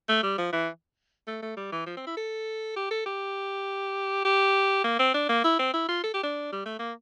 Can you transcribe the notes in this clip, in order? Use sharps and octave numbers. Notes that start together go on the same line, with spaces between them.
A3
G3
F3
E3
A3
A3
G3
E3
F3
C4
E4
A4
G4
A4
G4
G4
A#3
C4
D4
A#3
E4
C4
E4
F4
A4
G4
D4
G3
A3
A#3